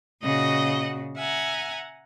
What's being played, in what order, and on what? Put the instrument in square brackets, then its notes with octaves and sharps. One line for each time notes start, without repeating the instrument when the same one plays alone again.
[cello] A#2 C#3 [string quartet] F#4 D#5 F#5
[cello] E5 [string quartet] F#5 G#5 A#5